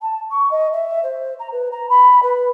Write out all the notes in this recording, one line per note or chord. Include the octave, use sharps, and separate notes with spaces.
A5
C#6
D#5
E5
C5
A#5
B4
A#5
B5
B4